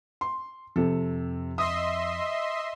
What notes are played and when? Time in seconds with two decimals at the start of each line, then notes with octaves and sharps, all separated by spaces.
0.21 C6
0.76 F2 C3 A4
1.58 D#5 E5 C6 D#6